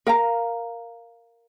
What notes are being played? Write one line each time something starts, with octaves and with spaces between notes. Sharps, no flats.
A#4 F5 A#5